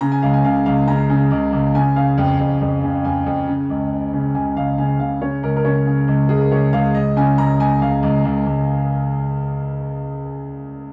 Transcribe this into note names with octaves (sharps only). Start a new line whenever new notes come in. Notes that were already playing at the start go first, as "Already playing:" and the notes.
C#3 A#5
G#5
C#2 F5
G#5
C#3 F5
C#2 F5
C#3 A#5
C#3
C#2
C#2
C#3 G#5
C#3 F5
F2
F2
F2
C#3
F2 G#5
F2
C#3
C#2
C#3
C#3
C#2 G#5
C#2 F5
C#3 G#5
C#3 F5
C#3 C#5
C#2 A#4
A#4
C#3 C#5
C#3
C#2
C#2 G#4
A#4
C#2 C#5
C#2 F5
C#2 D#5
C#3 G#5
C#2 A#5
C#2 G#5
C#2 F5
C#2
C#2
C#2